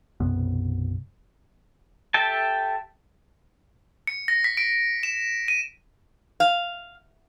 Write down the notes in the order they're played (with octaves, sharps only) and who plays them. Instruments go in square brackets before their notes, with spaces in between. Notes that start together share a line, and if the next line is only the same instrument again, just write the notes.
[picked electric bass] B1 F#2 C3 B3
[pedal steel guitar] G4 A4 E5 G5 A5
[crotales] C#7
A#6
B6
D7
E7
D#7
[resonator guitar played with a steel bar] F5